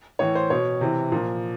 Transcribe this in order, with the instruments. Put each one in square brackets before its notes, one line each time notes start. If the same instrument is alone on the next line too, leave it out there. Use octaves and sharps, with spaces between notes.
[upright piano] A2 E3 C#5
C5
B2 C#5
C3 E3
A#2 F3